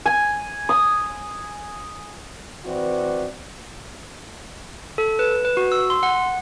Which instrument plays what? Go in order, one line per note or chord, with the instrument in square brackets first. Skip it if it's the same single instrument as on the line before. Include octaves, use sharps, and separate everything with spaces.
[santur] G#5
D#6
[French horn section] E3 C4 F#4 B4 D5
[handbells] A4
B4
B4
F#4
E6
C6
F#5